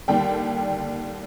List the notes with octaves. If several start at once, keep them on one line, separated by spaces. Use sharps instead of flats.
D#2 D3 G3 G5